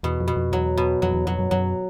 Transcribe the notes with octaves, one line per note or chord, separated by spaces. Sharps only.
E2 B2
F2
B2
F2
E2 F#3
B2
F2 F#3
E2
F2 F#3
F#2
F#2 F#3